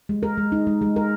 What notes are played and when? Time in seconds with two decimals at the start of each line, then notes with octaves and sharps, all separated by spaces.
0.09 G#3
0.23 A#4
0.37 G#3
0.52 D#4
0.67 G#3
0.82 G#3
0.96 A#4